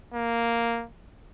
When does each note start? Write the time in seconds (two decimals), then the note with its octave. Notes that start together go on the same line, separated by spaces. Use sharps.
0.14 A#3